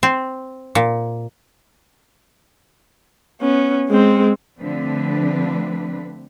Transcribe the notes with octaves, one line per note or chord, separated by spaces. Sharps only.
C4
A#2
B3 C#4
G#3 C4
D3 F3 A3 C4 D4 B4